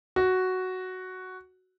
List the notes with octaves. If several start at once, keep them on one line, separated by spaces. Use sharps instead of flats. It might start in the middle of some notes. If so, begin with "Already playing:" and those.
F#4